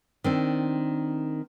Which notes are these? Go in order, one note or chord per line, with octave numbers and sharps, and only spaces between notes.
D#3 C4 D4